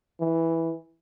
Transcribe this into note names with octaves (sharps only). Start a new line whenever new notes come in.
E3